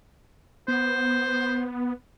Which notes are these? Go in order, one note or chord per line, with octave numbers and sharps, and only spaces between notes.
B3 C5